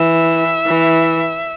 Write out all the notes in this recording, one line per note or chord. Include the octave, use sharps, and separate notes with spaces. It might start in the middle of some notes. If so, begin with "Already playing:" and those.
Already playing: E3 E5
E3